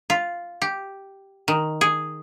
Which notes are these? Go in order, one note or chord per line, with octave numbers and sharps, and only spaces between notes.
F4
G4
D#3
G#4